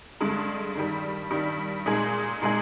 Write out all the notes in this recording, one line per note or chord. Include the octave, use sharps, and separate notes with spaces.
G2 D3 G#3
G2 D#3 G3
G2 D#3 G3
A#2 G#3 D#4 G#4
A#2 G#3 D#4 G#4